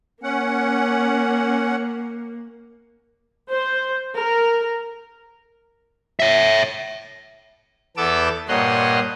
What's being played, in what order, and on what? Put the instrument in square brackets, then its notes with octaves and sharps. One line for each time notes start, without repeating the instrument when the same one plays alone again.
[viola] A#3 [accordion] C#4 F#5
[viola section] C5
A#4
[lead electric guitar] C#5 E5
[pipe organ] E2 B3 A4 D6 E6
G2 A#2 C#5 D#5 F#5 C6